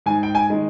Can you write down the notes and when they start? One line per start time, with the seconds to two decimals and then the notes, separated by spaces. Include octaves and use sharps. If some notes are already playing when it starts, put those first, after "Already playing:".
0.06 G#2 G#5
0.23 G5
0.35 G#5
0.50 D#3 G#3